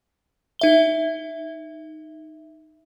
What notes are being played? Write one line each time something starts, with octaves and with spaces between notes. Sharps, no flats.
D#4 E5 G7